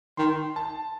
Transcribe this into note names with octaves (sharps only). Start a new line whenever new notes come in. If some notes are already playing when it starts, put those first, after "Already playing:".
D#3 C6
A5